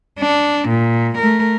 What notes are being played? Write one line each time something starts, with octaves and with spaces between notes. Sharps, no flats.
D4
A#2
A3 A#4